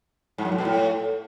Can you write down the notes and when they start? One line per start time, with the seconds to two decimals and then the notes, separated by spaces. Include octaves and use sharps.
0.38 G#2
0.45 F#2
0.52 A2
0.58 B2
0.65 A2